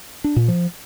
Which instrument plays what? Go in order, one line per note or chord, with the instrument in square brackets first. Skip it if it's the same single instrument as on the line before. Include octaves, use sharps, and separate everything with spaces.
[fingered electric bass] D4
A#2
F3